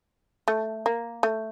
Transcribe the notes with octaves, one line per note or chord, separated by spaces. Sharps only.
A3
A#3
A3